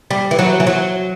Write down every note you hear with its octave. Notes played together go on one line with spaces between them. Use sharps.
G3
E3
F#3
E3
F#3